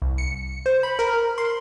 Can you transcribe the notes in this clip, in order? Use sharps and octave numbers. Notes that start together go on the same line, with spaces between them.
C2
C#7
C5
B5
A#4
C6